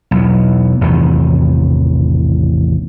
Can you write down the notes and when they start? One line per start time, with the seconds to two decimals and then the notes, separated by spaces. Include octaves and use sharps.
0.11 B1 E2
0.81 A1 E2 C3 D#3